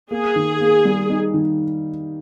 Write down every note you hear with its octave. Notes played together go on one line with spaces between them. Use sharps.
A#3 G#4
D#3
A#3
G3
D#4
D#3